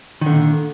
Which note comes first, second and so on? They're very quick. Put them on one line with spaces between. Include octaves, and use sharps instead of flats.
D#3 D3 A#2